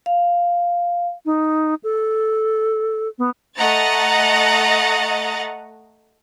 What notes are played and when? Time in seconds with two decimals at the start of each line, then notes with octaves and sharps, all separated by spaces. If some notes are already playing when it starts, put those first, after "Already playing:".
0.06 F5
1.25 D#4
1.83 A4
3.18 B3
3.58 A3 D#5 F#5 A#5 A6